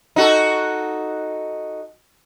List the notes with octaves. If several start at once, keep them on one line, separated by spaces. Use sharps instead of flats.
D#4 F#4 A4